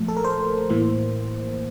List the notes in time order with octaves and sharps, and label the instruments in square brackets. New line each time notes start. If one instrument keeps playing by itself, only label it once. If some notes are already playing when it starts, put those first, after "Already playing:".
Already playing: [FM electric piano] A#2 F3 A3
A4
A#4
C5
A2 E3 A#3